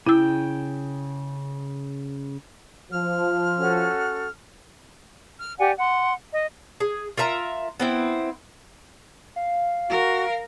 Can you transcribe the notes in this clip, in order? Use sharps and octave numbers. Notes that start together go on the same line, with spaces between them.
C#3 E4 G5 E6
F3 F6
C#4 F#4 A4
F6
G4 D5 F#5 G#5
F#5 C6
D#5
G#4
F4 A#4 E5 A#5
B3 C4 E4
F5
F#4 A#4